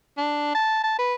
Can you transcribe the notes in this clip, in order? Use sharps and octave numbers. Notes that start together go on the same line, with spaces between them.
D4
A5
A5
B4